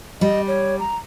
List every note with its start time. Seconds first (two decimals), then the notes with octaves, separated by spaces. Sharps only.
0.21 G3 D#5
0.48 C#5
0.79 A#5